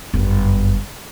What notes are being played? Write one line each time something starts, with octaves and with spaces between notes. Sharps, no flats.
G1 F#2